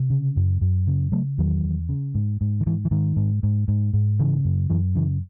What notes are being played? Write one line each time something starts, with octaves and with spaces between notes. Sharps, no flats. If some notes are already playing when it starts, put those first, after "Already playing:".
Already playing: C3
C#3
F#2
F#2
C#3
C#3 F#3 A3
E2 D#3 F#3
E2
C#3
G#2
G#2
D#3
G#2 E3
E3
G#2 D#3
G#2
G#2
G#2
G#2
C#3 E3
F#2
F#2 E3
C#3 E3